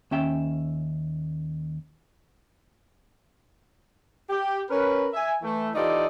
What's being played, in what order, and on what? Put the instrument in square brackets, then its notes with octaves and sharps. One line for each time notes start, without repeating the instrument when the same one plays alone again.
[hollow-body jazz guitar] D#2 C#4 E5 G5
[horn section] G4
C#4 A#4 B4
E5 G#5
E3 A3
E3 D#4 F4 G4 A4 D5